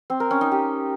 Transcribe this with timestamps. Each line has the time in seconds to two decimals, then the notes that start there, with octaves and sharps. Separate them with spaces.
0.10 C4
0.20 A#4
0.31 C#4
0.41 D#4
0.52 G4